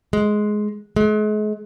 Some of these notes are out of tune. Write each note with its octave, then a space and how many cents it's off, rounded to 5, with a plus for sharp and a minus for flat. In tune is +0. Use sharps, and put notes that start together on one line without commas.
G#3 +10
G#3 +40